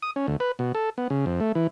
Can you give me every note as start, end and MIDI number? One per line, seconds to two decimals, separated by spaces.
0.02 0.11 87
0.16 0.27 61
0.27 0.36 38
0.40 0.52 71
0.59 0.72 47
0.75 0.90 69
0.98 1.08 59
1.10 1.25 49
1.26 1.40 41
1.40 1.52 57
1.55 1.67 52